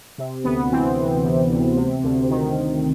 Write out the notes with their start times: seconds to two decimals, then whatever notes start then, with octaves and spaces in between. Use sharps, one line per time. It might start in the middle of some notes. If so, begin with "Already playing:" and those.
0.18 C3
0.44 D2 B3
0.72 E3 C4
0.97 D2
1.24 C3
1.50 D2
1.77 C3
2.03 D2
2.30 D#3